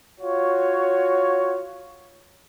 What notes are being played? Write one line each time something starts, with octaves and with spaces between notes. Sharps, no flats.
F4 F#4 C#5